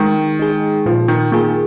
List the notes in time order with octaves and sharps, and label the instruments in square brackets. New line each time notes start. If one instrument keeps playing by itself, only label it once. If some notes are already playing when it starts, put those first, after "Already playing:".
Already playing: [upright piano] D#3 [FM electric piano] G#3
[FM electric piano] D#4 G#4
[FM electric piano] A#2 [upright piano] F3
[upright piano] D#3
[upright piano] D#3 [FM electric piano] A#3 F4 G#4